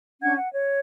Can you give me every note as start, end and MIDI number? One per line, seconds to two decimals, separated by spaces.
0.21 0.35 61
0.21 0.35 62
0.21 0.35 78
0.21 0.35 92
0.36 0.51 78
0.53 0.80 73